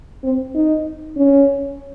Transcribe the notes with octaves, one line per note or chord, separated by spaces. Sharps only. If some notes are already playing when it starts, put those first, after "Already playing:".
C4
D#4
C#4